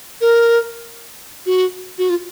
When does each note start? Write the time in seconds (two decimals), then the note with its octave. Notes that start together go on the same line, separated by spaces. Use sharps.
0.21 A#4
1.46 F#4
1.98 F#4
2.10 F4